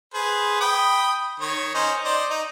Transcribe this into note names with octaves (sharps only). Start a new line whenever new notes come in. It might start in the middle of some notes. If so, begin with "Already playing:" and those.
G#4 B4 C5
G5 B5 D#6
D#3 C#5 C#6
C#4 D#4 C5
C5 D5 D#5
D#4